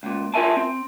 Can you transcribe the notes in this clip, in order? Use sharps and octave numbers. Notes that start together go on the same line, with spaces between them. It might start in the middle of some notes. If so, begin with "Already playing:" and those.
C#2 A#2
F4 G#4 A#4 E5 G#5 A5
C4